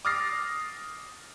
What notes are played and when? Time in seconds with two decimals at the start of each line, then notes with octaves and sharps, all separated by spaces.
0.05 D6 D#6 F6 A6 A#6 C7